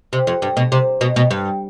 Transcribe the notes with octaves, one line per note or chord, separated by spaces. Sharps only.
C3
F2
G2
B2
C3
B2
B2
G2